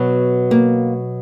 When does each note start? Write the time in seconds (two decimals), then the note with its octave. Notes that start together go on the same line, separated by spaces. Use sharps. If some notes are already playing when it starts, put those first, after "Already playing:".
Already playing: B2 F#3
0.51 A#3